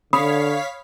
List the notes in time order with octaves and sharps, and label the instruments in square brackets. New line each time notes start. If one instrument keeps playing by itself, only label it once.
[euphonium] D3 [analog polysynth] C#5 F5 B6 [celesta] B5 D#6